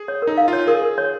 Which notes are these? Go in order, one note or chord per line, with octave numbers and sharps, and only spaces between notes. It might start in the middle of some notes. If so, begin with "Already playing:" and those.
Already playing: G#4
C#5
A#4
D#4
F5
F4 C#5
G#4 A#4
A#4
C#5